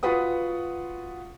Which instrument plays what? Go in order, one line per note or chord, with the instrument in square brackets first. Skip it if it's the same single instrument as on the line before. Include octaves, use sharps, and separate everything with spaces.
[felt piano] F4 F#4 B4 F#5 D#6